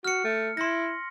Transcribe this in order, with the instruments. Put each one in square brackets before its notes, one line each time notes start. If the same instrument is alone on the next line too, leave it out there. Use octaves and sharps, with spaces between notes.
[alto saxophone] F#4 [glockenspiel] F6 C#7
[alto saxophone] A3
[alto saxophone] E4 [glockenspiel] C6 A#6